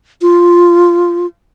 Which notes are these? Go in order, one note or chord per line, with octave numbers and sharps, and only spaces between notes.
F4